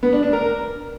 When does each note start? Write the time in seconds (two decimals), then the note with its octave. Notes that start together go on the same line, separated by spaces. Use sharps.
0.03 B3
0.13 D4
0.23 D4
0.33 A#4